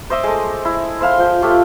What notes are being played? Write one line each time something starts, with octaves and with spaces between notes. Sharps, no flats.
C5 D#5 E5 D6
G#3 A3
E4
C5 E5 F5 C6
F3 G5
A3 F4 G4 C#5